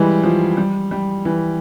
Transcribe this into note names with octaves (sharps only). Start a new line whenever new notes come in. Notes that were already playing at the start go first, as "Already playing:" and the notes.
Already playing: E3 G3 G#3
F3
G3
G3
E3